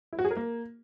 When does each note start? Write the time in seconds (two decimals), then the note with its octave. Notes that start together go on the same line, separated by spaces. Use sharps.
0.13 E4
0.19 F#4
0.25 G#4
0.31 A#4
0.37 A#3